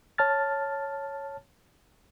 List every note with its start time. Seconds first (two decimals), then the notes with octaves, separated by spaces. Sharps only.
0.18 C#5 A5 F6 A6